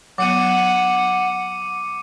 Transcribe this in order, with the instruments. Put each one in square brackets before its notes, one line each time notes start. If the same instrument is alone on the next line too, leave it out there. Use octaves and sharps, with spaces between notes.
[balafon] F#3 B3 [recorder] F#5 [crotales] D6 C#7 D#7